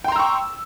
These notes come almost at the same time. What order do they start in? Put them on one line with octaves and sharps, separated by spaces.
G5 C6 A#5 E6 C#6